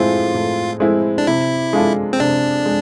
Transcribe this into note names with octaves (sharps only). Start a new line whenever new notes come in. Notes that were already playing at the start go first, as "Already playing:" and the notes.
Already playing: A2 G#3 C4 E4 F4
A2
G#3 C4 E4
D4
C3 E4
G#3 D4 F4 A4
C4
C3 D4
G#3